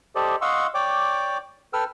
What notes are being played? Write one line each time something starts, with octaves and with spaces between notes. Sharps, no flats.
G4 A4 C5 D5 D#5
D#5 F5 F#5 C6 C#6 E6
C#5 D5 G5 D6
A4 B4 G5 E6 F6